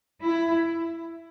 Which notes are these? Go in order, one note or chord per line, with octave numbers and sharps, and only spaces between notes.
E4